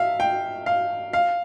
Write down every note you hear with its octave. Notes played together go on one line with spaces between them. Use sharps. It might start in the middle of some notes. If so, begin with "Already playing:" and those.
Already playing: E5 F5
G5
F5
F5